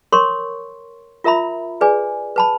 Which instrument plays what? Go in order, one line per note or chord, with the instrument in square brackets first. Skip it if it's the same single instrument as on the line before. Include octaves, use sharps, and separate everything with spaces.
[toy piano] A#4 C#5 C6 C#6
F4 A#4 E5 A#5 B5
G#4 B4 D5 G#5
B4 A5 B5